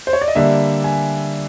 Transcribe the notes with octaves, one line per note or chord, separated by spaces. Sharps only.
C5
C#5
D5
D#5
D3 G3 A#3 E5
G#5